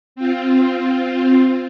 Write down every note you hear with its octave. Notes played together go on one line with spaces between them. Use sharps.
C4 F4